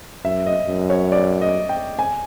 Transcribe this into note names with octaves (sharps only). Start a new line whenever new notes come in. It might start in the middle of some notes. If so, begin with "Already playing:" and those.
F#2 E5
D#5
F#2
C#5
D5
D#5
G5
G#5